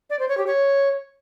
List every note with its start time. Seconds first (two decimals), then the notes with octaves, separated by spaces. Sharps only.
0.10 D5
0.19 C5
0.28 C#5
0.38 G4
0.47 C#5